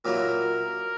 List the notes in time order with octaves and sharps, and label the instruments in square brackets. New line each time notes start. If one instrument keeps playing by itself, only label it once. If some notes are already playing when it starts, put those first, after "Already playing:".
[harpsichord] A#2 F#3 A#3 E4 [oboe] A#4